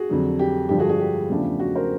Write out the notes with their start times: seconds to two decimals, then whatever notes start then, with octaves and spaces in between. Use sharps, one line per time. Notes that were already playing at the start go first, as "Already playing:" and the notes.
Already playing: F#4 G#4
0.09 F2 D3 F#3
0.39 G4
0.69 G2 D3 F3 G4
0.79 F#4 G#4
0.89 F#4 G#4
1.00 G4
1.29 E2 C#3 F3 A3 D4
1.60 F#4
1.75 A#4 C5